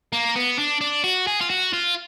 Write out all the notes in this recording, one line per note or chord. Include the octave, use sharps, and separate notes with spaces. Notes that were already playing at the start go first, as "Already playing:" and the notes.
A#3
B3
D4
D4
F#4
G#4
F4
F#4
F4